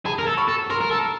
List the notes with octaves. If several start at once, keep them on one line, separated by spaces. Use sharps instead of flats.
G#4 A5 B5
A#4
A4
B5 C#6
A4
A#4 A#5 C6
A#4
A4